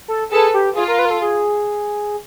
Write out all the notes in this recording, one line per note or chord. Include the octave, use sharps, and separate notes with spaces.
A4
G#4 A4 B4
G4
F4 G#4
A#4
B4
A#4
A4
G#4